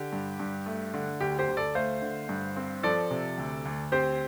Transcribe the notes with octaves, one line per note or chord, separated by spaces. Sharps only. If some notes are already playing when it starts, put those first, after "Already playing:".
Already playing: D3 G4
G2
G2
A3
D3
D2 G4
G4 C5
D2
A4 D5
A3 C5 F5
D3
G2
C4
F3 A4 D5
C3
D2
D2
C4 G4 C5